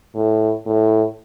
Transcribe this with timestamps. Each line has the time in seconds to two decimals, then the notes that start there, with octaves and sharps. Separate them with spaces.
0.15 A2
0.66 A2